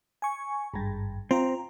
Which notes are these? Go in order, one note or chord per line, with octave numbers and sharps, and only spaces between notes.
G#5 C#6
G#1 G2
C4 F4 A#5